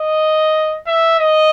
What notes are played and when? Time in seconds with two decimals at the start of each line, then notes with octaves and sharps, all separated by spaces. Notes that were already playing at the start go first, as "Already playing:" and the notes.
Already playing: D#5
0.87 E5
1.19 D#5